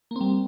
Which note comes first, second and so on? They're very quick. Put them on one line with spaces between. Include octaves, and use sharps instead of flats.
A#3 C4 G3